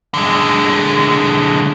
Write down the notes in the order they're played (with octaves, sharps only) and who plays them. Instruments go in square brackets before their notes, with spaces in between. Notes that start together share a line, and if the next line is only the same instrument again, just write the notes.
[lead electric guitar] D3 G#3